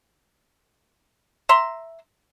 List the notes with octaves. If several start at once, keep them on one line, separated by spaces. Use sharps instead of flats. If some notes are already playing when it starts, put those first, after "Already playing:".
E5 A#5 C6